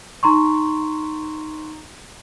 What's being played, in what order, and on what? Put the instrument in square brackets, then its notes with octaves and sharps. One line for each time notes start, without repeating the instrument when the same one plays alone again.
[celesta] D#4 A#5 C6 C#6